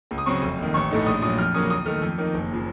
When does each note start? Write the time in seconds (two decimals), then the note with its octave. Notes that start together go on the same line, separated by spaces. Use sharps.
0.11 C#2
0.18 D#6
0.26 C#3 F#3 C4 C#6
0.42 F1
0.58 D#2 D#3
0.74 A1 C#6
0.91 A2 A3 D#4
1.06 A#1 D#6
1.22 A#2 F#3 D#6
1.38 F2 F6
1.54 C#3 F#3 A#3 C#4 D#6
1.70 D#2 D#6
1.86 D#3 A3 F6
2.02 F2
2.18 D#3 A#3 D#4
2.34 F#1
2.51 C#3 F3